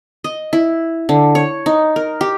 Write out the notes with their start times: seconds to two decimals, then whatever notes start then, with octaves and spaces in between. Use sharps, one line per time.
0.24 D#5
0.53 E4
1.09 D3
1.35 C#5
1.66 D#4
1.96 A#4
2.21 G4